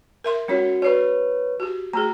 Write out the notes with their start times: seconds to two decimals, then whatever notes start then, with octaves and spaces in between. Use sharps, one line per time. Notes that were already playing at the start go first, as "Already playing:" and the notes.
0.24 A#4 E5 C6
0.48 G#3 C#4 F#4 C#5 C#7
0.82 F#4 B4 C#5 D5
1.60 F#4 G4
1.93 A3 F#4 G#4 A#5